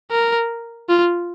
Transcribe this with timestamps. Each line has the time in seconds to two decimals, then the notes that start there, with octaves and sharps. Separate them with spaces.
0.11 A#4
0.89 F4